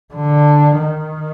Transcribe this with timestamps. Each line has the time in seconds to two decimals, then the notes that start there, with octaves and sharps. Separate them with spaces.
0.14 D3
0.83 D#3